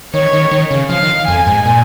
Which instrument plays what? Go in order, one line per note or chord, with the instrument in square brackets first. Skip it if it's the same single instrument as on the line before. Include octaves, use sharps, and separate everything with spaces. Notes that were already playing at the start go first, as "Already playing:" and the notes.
[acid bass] D#3 [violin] C#5
[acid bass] D#3
D#3
C#3
[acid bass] F3 [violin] F5
[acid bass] D#3
[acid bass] F2 [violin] G#5
[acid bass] G#2
A#2